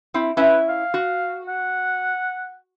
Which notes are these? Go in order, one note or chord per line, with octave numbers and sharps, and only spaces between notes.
C4 E4
C#4 E4 B4 E5
F5
F#4
F#5